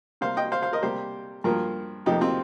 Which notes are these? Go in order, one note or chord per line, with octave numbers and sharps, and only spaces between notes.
C3 G3 A#3 C5 F5
D#5 G5
C5 F5
C5 F5
A#4 D#5
C3 G3 A#3 G4 C5
G2 F3 A#3 F4 A#4
F2 C3 F3 A#3 D#4 G4
C4 F4